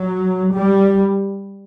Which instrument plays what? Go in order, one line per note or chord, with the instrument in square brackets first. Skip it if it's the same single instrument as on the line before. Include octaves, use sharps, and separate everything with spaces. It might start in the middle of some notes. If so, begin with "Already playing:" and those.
Already playing: [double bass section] F#3
G3